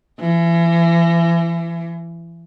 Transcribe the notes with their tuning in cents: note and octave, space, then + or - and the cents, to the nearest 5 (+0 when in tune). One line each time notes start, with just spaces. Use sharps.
E3 +35